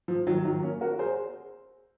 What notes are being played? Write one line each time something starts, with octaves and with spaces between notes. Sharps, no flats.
F3
D#3 F#3
D#3 F#3
A#3 C#4
F#4 A#4
G#4 C5